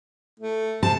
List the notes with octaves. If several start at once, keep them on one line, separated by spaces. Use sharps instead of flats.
A3
C3 A5